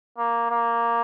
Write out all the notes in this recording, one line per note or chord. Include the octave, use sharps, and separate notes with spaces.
A#3
A#3